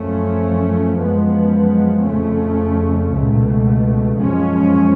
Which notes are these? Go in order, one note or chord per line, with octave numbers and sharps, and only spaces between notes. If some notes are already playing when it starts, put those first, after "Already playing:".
Already playing: F#2 F3 A3 C#4
F#2 F3 G#3 B3
F2 C#3 F3 A3 C#4
C#2 B2 A3
F#2 F3 G#3 C#4